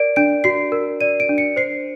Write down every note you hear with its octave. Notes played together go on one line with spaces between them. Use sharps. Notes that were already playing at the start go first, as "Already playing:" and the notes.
Already playing: A#4 D5 D7
D4 D7
F#4 C7
A#4
D5 D#7
D7
D4
C#7
C5 C7